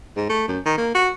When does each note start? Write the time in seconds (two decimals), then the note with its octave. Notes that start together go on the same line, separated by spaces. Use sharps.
0.17 G#2
0.29 A3
0.48 F#2
0.65 D#3
0.78 A#3
0.94 F#4